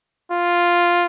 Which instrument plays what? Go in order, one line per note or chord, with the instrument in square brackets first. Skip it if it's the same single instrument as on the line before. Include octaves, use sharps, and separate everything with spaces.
[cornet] F4